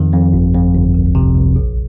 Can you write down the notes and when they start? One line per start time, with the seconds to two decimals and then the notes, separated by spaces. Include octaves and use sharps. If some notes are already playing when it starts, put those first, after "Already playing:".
Already playing: F2 D#3
0.13 F2
0.33 G1
0.54 F2
0.74 G1
0.94 C2
1.15 C3
1.36 C2
1.56 A#1